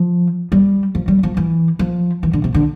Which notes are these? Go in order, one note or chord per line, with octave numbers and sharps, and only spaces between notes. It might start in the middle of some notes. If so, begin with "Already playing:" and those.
Already playing: F3
G3
F3
G3
F3
E3
F3
E3
D3
C3
D3